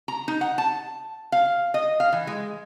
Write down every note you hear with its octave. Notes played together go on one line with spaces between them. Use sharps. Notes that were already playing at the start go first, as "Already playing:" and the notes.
A#5
D#4
F#5
A5
F5
D#5
F5
E3
G#3